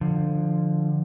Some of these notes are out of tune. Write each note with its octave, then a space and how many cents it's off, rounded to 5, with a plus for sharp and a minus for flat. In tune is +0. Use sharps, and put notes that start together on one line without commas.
D3 +20 F3 +0